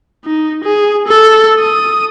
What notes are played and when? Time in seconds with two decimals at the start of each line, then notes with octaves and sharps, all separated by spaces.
0.25 D#4
0.64 G#4
1.08 A4
1.59 D#6